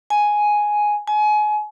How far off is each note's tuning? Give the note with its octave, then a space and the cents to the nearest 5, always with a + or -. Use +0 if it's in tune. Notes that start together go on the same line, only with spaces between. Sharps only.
G#5 +5
G#5 +30